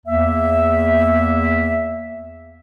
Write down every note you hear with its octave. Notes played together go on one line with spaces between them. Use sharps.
E2 A#3 E5